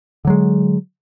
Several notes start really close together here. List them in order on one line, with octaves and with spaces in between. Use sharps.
D3 F#3 G#3